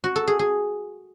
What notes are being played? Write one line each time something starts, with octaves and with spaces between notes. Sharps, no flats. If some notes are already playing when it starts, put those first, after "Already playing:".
F#4
A4
G#4
G#4